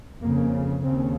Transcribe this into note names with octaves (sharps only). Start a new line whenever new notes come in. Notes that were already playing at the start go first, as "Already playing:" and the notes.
F2 C#3 A#3
D#2 C#3 C4